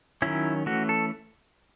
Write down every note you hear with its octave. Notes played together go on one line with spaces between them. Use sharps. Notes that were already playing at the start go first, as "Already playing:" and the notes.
D#3 F#3 C#4 E4
E3 A3 C#4 F#4
A4